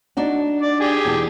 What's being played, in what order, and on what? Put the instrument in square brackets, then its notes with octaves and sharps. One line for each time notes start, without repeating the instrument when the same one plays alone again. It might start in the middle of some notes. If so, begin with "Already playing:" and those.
[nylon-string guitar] D4 D#4 F#4
[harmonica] D5
G4 G#4
[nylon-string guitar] E2 B2 A4